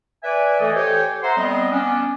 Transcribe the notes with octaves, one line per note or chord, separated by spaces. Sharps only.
B4 D5 E5 G#5
E3 A3 A4 D#5
G4 A4 C5 C#5 G5 G#5
C5 E5 F#5 A#5 C6
G3 B3 C4 D#5
B3 C#4 D4